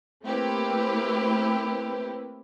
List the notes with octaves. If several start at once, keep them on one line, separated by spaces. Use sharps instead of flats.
A3 A#3 C4 E4 G4 B4